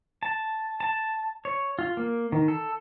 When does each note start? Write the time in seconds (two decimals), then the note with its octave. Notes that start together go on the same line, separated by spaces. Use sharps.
0.23 A5
0.80 A5
1.45 C#5
1.79 F4
1.97 A#3
2.32 D#3
2.48 A4